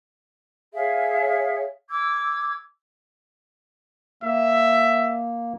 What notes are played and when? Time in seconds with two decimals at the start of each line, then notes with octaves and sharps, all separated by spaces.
0.74 G#4 C#5 E5 F5
1.89 D6 E6 G#6
4.23 A#3 E5